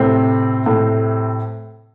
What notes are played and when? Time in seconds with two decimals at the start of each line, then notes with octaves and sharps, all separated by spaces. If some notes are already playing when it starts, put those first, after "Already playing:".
Already playing: A2 C3 C4
0.66 A2